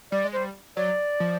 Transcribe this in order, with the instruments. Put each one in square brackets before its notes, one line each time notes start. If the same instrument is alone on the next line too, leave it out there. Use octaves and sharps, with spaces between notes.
[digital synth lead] G3 [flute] D5
[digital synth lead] G#3
[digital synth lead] G3 [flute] C5
[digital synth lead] F#3 [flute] D5
[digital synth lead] F3